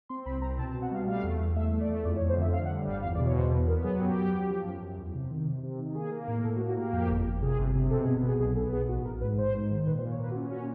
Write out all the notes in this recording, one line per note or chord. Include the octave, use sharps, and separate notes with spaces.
C4 C6
C2 B5
C4 A#5
B2 A5
A5
B2
F#5
G3 F5
A3 F5
E2
E2
A3 E5
A3
D5
E2
F2 D5
C#5
F2
C5
D3 E5
D3 F5
F#5
G3
G1 F5
E2 F5
D5
B2
C#5
E2 C5
B3 B4
B3 A#4
F#3 G#4
F#2 G4
F#2
F#2
F3
F#2
F#2
E2
C3
D#3
C3
C3
D#3
A#3 G#4
A#3
A2
A2 A4
F#4
A#3
F#4
A#3 G4
F2 G4
G1
G1
C3 G#4
G1
C3
B2 A4
G#4
B3
B2
G#4
B1 G#4
B3 A4
B1 G#4
A1 F#4
A1 A#4
G#2 B4
A1 C5
G#2
D#3
A#2 B4
C5
A#3
C#5
A#2 B4
F#4
C#4 F4
A#2 F#4